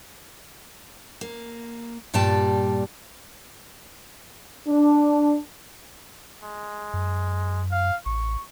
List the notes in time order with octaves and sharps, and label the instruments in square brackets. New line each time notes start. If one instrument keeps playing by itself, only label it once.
[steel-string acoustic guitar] A#3
G2 A#2 G3 D5 G5 A5
[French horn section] D4
[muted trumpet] G#3
[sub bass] F#2
[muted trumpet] F5
[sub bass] A1 [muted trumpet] C#6